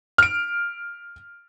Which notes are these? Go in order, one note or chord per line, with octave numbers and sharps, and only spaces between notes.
F6 D7